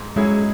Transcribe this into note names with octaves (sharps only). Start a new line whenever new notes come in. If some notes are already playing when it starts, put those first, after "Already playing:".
Already playing: G#2
F#3 G#3 C#4 E4 G#4